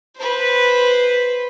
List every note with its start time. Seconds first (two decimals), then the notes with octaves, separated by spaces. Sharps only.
0.17 B4 C5